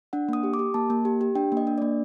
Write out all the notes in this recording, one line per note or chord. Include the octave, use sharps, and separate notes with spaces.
D4 F#5
A#3 D#6
G4
D6
G4
A#3 A5
A#3
G4
G4
D4 G5
A#3
D#5
D4
D5
A#3